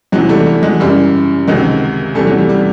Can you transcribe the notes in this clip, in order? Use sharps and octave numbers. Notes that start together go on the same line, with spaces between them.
E2 C3 E3 F#3 G#3
G3 A3
G3
F#3 G#3
F#2 C#3 E3 G3
C#2 C3 D#3 F#3 G#3
E2 C3 E3 G3 A3
F#3
G3
G3